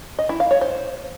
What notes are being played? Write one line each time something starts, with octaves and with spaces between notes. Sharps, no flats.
D#5
E4
F5
C#5
C5